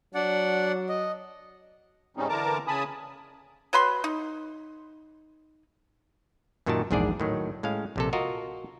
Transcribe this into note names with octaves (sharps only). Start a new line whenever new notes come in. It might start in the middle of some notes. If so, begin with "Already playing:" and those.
F#3 D4 D5 F#5
D#5
G#2 C#3 G3 C4 C#4 D#4
D3 E3 A#4 A5 A#5 D6
C#3 G#5 A5 B5 D#6
F#3 B4 B5 C6
D#4
F#2 A#2 D#3 F#4 G4 A5
A#1 E2 G#2 D4 G#4 D5
A2 D#3 F#3
A2 G#3 C#4 F5
A#1 C3 A4
F4 F#4 A#4 D#5